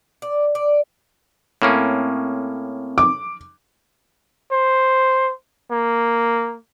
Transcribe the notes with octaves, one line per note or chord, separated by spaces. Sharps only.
D5
D5
A2 A#3 C4 C#4
D6
C5
A#3